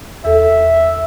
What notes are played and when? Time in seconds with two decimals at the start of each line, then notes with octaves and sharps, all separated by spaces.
0.25 E2 A4 E5